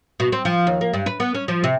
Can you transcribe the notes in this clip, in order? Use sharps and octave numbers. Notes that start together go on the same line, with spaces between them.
B2
C4
F3
D#2
A#3
G2
B4
B3
C#4
F3
C3